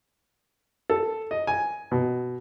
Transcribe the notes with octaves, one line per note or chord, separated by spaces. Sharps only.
A4
D#5
G#5
B2